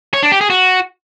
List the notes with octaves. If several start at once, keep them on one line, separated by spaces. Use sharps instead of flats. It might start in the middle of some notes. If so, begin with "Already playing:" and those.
C#5
D4
G4
G#4
F#4